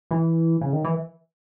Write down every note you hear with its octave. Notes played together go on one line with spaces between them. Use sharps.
E3
C#3
D#3
E3